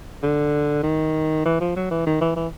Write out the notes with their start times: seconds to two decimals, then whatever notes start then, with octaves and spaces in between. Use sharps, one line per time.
0.23 D3
0.83 D#3
1.45 E3
1.60 F3
1.76 F#3
1.91 E3
2.06 D#3
2.21 E3
2.36 E3